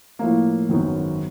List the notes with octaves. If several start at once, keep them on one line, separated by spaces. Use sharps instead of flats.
A2 F3 A#3
G#1 F#2 D#3 F#3 B3